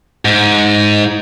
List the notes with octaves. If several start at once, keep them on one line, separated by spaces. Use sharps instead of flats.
G#2